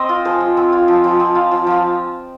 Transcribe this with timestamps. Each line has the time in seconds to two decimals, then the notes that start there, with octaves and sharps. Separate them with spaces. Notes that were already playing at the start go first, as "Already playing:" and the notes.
Already playing: C4 C5 D#5 G5
0.09 F4
0.25 F3 G#4 C5
0.40 F3
0.57 C4
0.72 F4
0.88 F3
1.04 F3
1.20 C4
1.35 F4
1.51 F3
1.67 F3 F4